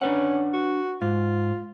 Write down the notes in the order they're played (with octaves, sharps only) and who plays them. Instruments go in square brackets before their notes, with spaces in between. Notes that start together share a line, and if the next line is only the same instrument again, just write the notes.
[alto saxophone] C#4 [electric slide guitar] D4 B4 F#5
[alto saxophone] F#4
[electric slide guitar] G#2 [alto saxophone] F4